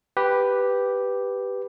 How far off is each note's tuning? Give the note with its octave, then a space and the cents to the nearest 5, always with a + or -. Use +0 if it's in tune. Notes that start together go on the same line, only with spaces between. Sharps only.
G4 +0 B4 +0